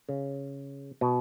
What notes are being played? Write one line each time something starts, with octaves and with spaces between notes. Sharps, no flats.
C#3
B2